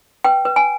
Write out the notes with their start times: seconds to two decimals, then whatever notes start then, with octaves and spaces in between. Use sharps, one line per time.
0.24 B4 G5
0.45 B4
0.56 G#5